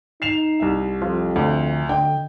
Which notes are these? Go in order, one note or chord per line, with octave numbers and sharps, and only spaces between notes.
D#4 C7 E7 F7
C2 E5
F2 F3
D2 D3
D3 D#5 G5